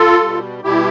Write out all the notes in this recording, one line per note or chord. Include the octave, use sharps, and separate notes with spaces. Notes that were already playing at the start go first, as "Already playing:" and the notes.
Already playing: F4 A4
B2 G3
B2 G3 E4 G4